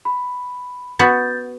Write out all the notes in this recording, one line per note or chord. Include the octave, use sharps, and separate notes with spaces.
B5
B3 C#4 F#4 G6 A6